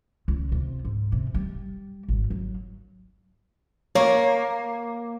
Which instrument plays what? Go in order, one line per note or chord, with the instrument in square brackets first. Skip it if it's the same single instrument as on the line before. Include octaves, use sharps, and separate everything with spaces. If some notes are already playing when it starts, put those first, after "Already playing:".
[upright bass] C#2
C3
G#2
C3
G3
G#1
F#3
[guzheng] A#3 [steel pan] C#5